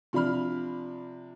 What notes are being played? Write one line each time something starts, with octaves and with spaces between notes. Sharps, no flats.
C3 F3 D4 B5 F6